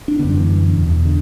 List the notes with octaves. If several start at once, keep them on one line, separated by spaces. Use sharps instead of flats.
D4
D3 B3
F#2 G3
E3
E2 B2
D3